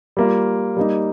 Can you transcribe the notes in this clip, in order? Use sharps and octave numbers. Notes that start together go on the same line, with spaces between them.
G3 A#3 F4
G3 A#3 D#4